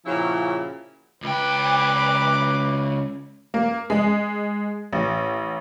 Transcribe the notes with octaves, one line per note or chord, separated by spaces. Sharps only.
A#2 C#3 F3 C#4 E4 F#4
C#2 B4 G5 D6
A#3
G#3
A1